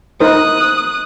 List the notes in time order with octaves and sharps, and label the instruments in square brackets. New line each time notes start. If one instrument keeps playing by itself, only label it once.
[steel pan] D#4 A#4 C5 [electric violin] D#6 F#6